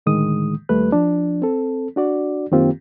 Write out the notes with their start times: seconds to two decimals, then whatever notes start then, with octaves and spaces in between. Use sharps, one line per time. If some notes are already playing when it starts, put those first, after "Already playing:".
0.06 A2 D3 D#3 G#3 D#6
0.69 D#2 G3 A3 B4 F#6
0.92 F3 D4
1.42 C4 A4
1.96 D4 F#4 D5
2.52 F#2 D#3 A#3 C4 F4 G4